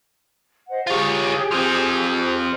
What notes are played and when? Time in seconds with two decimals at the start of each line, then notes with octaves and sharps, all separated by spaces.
0.69 C5 D#5 F#5
0.87 F4 G4 G#4 C#5
1.52 F3 C4